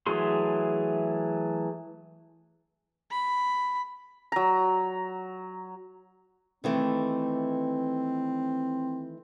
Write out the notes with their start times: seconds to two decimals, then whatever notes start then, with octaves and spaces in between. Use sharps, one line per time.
0.06 E3 F#3 A3 G#4 C6
3.11 B5
4.32 F#3 A#5
6.64 D#3 E3 A3 C4